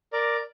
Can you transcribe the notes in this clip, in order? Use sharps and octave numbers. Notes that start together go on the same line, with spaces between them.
A#4 D5